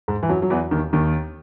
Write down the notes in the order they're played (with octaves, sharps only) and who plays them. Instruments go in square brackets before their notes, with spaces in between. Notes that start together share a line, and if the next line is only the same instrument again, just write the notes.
[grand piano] G#2 G#3
E3
F#2 F#3
F#3
E2 E3
D#2 D#3
D#2 D#3